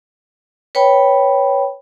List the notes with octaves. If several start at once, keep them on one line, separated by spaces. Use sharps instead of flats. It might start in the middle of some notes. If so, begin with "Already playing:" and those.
B4 C#5 G5 B5